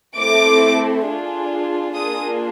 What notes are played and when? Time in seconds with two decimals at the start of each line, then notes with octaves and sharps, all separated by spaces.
0.16 A3 C4 E4 A4 D6
1.05 D4 F4 G#4
1.94 A#3 D4 F4 G#4 D#6